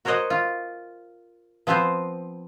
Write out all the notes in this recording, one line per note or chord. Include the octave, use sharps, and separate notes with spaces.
F#4 A#4 C5 C#5 D#5 F#5
F4
F3 B3 C4 B4 C5